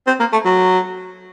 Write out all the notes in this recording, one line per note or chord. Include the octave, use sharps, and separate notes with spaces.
C4
A#3
A3
F#3